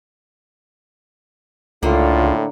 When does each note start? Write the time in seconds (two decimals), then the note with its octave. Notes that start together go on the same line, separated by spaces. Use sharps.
1.83 C#2 A2 D3 A#3 F4